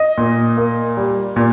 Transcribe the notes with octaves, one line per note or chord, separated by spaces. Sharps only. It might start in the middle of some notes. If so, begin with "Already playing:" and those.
Already playing: D#5
A#2
A#3
G3
A#2